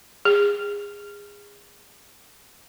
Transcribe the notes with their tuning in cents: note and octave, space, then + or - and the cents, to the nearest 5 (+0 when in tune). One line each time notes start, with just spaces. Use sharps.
G#4 -25